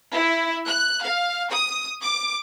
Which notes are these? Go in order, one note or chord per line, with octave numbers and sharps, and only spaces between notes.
E4
F#6
F5
D#6
D6